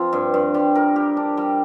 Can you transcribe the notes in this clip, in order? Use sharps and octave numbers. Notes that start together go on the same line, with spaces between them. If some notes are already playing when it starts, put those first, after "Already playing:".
Already playing: F3 C4
G2
G2
G3
A#4
G4
D4
G3